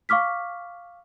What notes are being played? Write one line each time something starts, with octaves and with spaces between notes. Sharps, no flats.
F5 C#6 D6 F6 B6